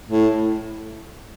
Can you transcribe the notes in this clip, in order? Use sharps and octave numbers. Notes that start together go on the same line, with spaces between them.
A2